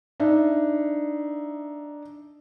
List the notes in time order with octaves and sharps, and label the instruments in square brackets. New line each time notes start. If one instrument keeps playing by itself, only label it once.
[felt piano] D4 D#4 E5